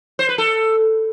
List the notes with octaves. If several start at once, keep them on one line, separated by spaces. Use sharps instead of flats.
C5
B4
A4